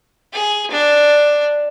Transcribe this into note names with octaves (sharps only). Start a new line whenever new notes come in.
G#4
D4